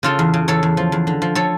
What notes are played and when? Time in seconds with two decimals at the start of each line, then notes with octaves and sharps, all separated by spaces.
0.03 C#3 F4 A4
0.19 E2
0.34 C#3
0.48 E2 A4 C#5
0.63 E2
0.77 F3
0.92 E2
1.07 D3
1.22 F3
1.35 F3 A4 C#5